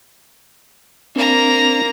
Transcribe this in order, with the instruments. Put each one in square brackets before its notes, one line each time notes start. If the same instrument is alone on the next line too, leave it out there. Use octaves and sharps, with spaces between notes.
[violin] A#3 A#5 [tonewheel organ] C4 D4